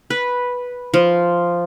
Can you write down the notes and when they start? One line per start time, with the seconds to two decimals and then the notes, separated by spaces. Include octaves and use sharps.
0.10 B4
0.94 F3